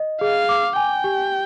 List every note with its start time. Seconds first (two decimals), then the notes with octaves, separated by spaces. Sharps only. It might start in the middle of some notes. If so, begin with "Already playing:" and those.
Already playing: D#5
0.21 G#4 F5
0.49 D6
0.76 G5 G#5
1.04 G4